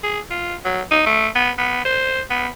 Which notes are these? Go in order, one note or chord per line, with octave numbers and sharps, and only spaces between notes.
G#4
F4
F#3
D#4
A3
B3
B3
C5
B3